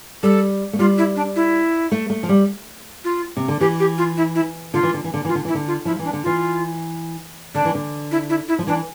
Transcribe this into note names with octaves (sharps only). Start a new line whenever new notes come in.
G3 A4
A3
G3 F4
E4
D4
E4
A3
A3
F3
G3
F4
C3
D3
E3 G4
G4
F4
E4
E4
D3 F4
E3
D3
E3
D3
E3 F4
D3
E3 E4
D3
F4
F3 E4
E3
D4
D3
E3 F4
D3 D4
E3
D3
E4
E4
E4
F3
E3 D4